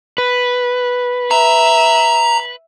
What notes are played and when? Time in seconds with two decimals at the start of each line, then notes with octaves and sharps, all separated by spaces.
0.18 B4
1.31 E5 A#5